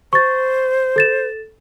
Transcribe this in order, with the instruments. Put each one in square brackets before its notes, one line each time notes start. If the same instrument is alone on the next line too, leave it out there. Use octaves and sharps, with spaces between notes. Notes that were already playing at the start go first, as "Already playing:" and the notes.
[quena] C5 [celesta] C#6 A6
[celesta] A4 A6 E7